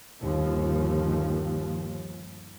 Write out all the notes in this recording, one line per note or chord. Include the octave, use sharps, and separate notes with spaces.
G1 D#2 F3